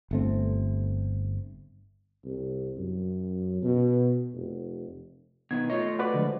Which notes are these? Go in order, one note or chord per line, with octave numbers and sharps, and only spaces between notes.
G1 A3 C4
C2
F#2
B2
F1
B2 D#3 B3 G#6
A3 F4 C#5 D#5
F#4 B4 D5
D3 F3 G#3